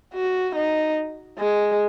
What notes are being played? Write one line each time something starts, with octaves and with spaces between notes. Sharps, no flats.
F#4
D#4
G#3